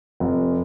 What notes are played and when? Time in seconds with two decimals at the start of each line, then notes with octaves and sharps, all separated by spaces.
0.20 F1